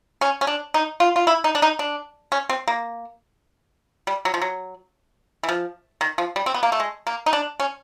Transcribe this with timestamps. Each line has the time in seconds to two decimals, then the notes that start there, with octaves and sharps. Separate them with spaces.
0.21 C#4
0.41 C#4
0.47 D4
0.74 D#4
1.00 F4
1.16 F4
1.27 E4
1.44 D#4
1.55 D4
1.62 D#4
1.79 D4
2.32 C#4
2.49 C4
2.68 A#3
4.07 G3
4.25 F#3
4.34 F3
4.41 F#3
5.43 E3
5.49 F3
6.01 D#3
6.18 F3
6.36 G3
6.46 C4
6.54 B3
6.63 A#3
6.72 A3
6.80 G#3
7.07 A#3
7.26 D#4
7.33 D4
7.60 C#4